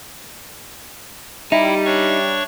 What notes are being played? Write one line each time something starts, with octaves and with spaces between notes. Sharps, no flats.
G3 D#4 E4 E5
D4 C#5 C#6